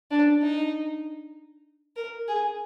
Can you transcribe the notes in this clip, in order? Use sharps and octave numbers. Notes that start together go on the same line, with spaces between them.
D4
D#4
A#4
G#4